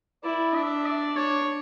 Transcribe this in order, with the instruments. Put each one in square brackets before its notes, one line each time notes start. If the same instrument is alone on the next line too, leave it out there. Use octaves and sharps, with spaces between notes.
[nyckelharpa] E4 [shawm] D5
[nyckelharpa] D4 [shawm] E5
[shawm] D5
[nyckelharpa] D4 [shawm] C#5